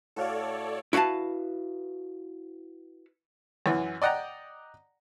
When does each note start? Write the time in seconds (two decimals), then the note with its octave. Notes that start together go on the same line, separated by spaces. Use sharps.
0.16 A2 F#4 A4 C#5 D5 F5
0.93 E4 F#4 B4 F5 A5
3.66 F#2 E3
4.02 D5 D#5 F#5 G5 A#5